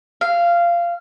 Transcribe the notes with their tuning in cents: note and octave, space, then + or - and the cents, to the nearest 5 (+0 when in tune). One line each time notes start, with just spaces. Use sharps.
F5 -15